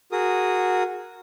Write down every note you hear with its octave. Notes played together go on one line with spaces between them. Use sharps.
F#4 G#4 A#4 D#6